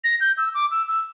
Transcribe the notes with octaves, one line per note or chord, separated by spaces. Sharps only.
A#6
G6
E6
D6
E6
E6